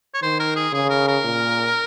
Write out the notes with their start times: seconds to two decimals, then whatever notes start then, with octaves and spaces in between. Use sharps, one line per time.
0.14 C#5
0.22 D#3 C5
0.39 A#4
0.56 G#4
0.73 C#3 G#4
0.90 A#4
1.07 A#4
1.24 A#2